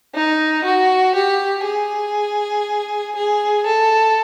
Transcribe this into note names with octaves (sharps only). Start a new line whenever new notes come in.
D#4
F#4
G4
G#4
G#4
A4